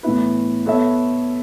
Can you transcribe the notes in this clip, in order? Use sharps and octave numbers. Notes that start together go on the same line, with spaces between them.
A2 E3 B3 E4 B4
B3 A4 C#5 E5